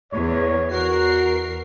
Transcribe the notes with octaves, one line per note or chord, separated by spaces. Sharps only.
E2 C#5
E2 F#4 A#4 C7